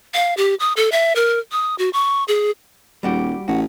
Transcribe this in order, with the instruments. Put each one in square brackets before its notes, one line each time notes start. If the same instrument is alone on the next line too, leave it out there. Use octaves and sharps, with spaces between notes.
[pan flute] F5
G4
D#6
A4
E5
A#4
D#6
F#4
C#6
G#4
[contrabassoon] D#1 [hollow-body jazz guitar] G3 F#4 G4
[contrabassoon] A1 [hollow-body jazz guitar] F#4